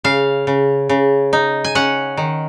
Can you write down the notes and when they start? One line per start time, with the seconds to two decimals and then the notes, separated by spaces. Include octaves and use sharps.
0.04 C#3 F5
0.47 C#3
0.89 C#3
1.33 D#4
1.64 G#5
1.75 C#4 F#5
2.17 D#3